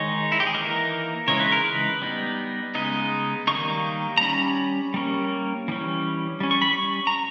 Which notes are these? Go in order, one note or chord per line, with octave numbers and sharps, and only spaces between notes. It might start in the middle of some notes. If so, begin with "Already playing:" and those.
Already playing: D#3 G#3 D#4 C#5
E4
G4
G#4
E3 A#3 D#4 A#4
C#3 E3 G#3 D#4 C#5
B4
A#4
B4
G3 B3 D#4
C#3 G#3 B3 D#4 D#5
D#3 G3 A#3 D#4 C#6
A#5
G3 C#4 B5
G3 A#3 C#4
E3 G3 C#4
G3 C#4
C#6
B5
C#6
A#5